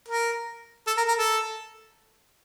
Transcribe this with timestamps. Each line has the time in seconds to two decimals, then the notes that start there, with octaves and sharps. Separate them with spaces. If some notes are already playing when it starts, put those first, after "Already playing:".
0.09 A#4
0.87 A4
0.98 A#4
1.09 A#4
1.19 A4